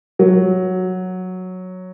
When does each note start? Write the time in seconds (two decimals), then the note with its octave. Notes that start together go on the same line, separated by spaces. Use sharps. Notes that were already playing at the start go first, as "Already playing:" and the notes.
0.19 F#3